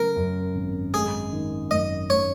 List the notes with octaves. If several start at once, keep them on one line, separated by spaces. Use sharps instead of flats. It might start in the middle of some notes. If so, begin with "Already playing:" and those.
Already playing: C#3 F#3 A#4
F#2
G#1
G#3 G#4
D#3
F#2 D#5
C#5